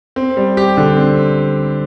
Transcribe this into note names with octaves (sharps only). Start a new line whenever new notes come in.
C4
G3
G4
D3
C4